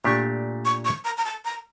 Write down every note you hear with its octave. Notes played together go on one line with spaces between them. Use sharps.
A#2 A3 D4 G4 C#6
C#6
C#6
A#5
A#5
A5
A#5